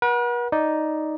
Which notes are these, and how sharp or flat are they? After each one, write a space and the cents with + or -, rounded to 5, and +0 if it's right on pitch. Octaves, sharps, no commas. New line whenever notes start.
B4 -45 F#5 +0
D#4 +0 D5 +0